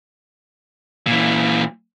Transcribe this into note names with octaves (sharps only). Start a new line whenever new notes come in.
A#2 E3